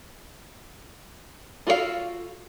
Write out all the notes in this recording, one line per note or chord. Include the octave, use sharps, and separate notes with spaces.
F4 F#4 A4 C5 F5